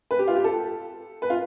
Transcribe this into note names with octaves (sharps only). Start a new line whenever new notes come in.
B4
G4
F4
G4
A4
B4
F4